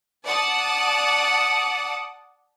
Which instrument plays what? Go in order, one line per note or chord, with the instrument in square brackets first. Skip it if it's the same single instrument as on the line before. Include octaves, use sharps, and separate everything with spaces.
[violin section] D5 F#5 A5 D#6